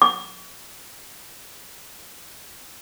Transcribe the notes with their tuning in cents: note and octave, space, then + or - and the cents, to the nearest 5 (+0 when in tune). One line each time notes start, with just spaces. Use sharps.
C#6 +45